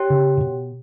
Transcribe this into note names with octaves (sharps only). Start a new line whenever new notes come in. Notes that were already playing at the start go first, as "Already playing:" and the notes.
Already playing: G4 C#5 G5
C#3
A#2
B2